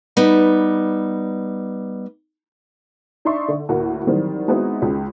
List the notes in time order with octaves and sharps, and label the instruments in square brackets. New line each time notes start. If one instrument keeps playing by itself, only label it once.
[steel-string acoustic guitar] G3 B3 D#4
[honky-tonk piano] D4 D#4 D5 E5 C6 C#6
D3
D2 A2 A#3 F#4
D#3 E3 F#3 G3 C4
G#3 B3 C4 D#4 E4 F#4
C#2 G#3